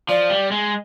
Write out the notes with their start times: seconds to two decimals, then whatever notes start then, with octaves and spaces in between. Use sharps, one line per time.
0.09 F3 D5
0.30 G3
0.51 G#3